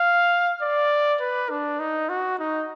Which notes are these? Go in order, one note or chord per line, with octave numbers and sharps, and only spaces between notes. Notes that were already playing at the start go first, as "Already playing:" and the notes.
Already playing: F5
D5
B4
D4
D#4
F#4
D#4